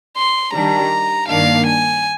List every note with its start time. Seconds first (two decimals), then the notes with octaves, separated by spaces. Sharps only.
0.17 C6
0.54 D#3 G3 D4 A#5
1.28 G2 D#3 A#3 D4 F5
1.67 G#5